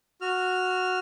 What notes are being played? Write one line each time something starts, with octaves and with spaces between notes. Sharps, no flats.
F#4 F6